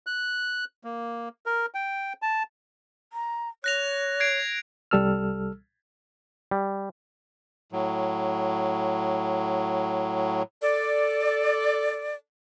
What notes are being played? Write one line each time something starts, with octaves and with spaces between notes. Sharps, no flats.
F#6
A#3
A#4
G5
A5
A#5
C#5 F#6 A#6 F7
G#6 C7 D7
C2 G3 A4 E6 F6
G3
A2 F#3
A4 D5